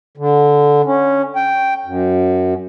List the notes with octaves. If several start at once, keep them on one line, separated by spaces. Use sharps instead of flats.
D3
C#4
G5
F#2